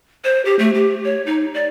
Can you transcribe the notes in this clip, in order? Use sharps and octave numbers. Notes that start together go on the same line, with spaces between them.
C5
G4
A3
G4
C#5
D#4
D5